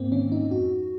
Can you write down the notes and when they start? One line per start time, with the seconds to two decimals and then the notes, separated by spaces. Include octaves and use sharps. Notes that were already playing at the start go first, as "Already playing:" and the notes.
Already playing: G#2 A#3 C4
0.12 D#3 C#4
0.32 D#4
0.51 F2 F#4